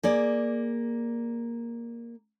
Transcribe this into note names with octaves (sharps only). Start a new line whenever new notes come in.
A#3 G#4 D5